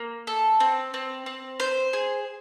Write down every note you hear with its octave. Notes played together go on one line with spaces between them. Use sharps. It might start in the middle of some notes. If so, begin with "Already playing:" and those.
Already playing: A#3
A4
C4
C4
C4
C5
G#4